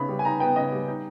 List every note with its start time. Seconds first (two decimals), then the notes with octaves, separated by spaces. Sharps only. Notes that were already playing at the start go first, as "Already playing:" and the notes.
Already playing: C#3 B3 D#4 B5
0.09 G3
0.19 G#5
0.25 D#4 A#5
0.40 B3 G5
0.56 C#3 D#5
0.72 G3
0.88 D#4